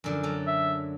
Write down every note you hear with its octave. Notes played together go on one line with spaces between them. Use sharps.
F#2 D3 F3
F#3 A4
E5